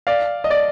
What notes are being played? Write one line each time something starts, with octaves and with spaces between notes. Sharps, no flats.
D5 F5
D#5
D5